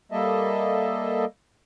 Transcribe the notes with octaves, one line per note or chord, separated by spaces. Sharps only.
G3 A#3 A4 D#5 E5